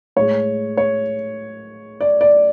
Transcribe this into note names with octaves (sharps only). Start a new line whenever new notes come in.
A2 G#3 C#5
C#5
D5
D5